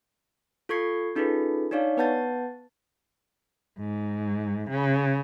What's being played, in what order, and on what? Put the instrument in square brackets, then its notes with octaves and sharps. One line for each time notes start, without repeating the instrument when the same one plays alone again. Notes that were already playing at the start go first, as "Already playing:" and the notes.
[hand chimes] F4 A4 C#6 G#6 C7 C#7
C#4 D#4 F4 G#4 A4 B4
D4 D#4 C#5 D5 F5
B3 B4 F#5 A5 G6 A6
[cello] G#2
C#3